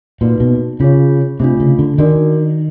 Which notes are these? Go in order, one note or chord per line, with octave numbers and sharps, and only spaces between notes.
A#2 A#3 D#4 F#4 B4 D5
B2
C#3 F4 G#4 C#5
C3 A3 D4 F4
C#3
D3
D#3 D4 F#4 A#4 D5